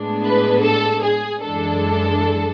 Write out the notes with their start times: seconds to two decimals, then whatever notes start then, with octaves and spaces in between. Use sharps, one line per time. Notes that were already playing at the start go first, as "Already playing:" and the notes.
Already playing: A2 G#3 B3 D4
0.24 B4
0.63 A4
1.03 G#4
1.41 F#2 E3 G#3 D4 A4